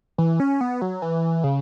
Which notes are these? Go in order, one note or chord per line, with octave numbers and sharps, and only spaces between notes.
E3
C#4
B3
F#3
E3
C#3